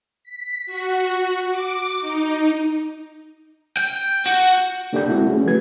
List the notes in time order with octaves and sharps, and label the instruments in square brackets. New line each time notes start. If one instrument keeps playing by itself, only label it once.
[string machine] B6
F#4
D6
D#4
[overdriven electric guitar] G5
F#4
[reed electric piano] A#3 D4 G4 A4 D5 G6
G#3 C4 E4 F#4 A4
A3 C#4 G#4
F3 F#4 B4 G#6